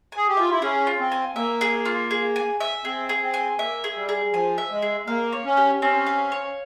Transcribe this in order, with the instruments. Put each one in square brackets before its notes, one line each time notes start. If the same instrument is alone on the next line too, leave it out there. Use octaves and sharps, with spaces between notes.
[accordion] G#4 [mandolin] G#5
[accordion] G4
[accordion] F4 [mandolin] E5
[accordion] E4
[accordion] C#4 [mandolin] G#4
[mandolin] F4
[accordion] C4
[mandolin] G#5
[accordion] A#3 [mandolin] E5
[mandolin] G#4
F4
G#4
G#5
E5
[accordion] C4 [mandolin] G#4
[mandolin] G#4
[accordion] C4
[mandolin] G#5
[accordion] A#3 [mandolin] E5
[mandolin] G#4
[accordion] G3
[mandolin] G#4
[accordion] F3 [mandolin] G#5
[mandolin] E5
[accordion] G#3
[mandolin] G#4
[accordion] A#3 [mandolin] F5
[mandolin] C#5
[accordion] C#4
[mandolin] G4
[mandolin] C4 [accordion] C#4
[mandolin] F5
C#5